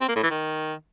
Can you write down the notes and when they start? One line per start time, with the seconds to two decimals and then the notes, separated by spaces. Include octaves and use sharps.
0.01 C4
0.08 A#3
0.16 A2
0.23 E3
0.30 D#3